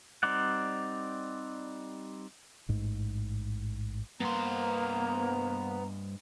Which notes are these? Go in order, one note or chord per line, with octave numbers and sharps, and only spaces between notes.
G3 C4 D#4 D5 F#5
A1 G#2
G2 A#3 B3 C5 A#5